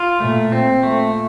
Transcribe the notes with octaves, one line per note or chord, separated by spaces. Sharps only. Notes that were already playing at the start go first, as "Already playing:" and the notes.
Already playing: F4
A#2 A3
A#2 C4
A3